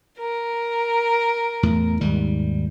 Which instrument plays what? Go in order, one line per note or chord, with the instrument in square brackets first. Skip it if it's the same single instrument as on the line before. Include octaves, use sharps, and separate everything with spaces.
[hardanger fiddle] A#4
[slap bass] E2 A2
D#2 G#2 G3